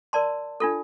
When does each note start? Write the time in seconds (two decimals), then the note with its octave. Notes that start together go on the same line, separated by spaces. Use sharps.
0.13 A#4 D5 A5 C6
0.60 D4 F4 A4